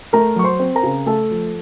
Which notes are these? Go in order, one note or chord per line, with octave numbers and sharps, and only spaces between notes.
A3 A#4 A#5
F#3 C#6
C5 C6
C4
A#4 A#5
C#3
A3 A4 A5
F3